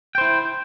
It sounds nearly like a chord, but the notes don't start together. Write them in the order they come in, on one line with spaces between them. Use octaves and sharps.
G5 C5 E4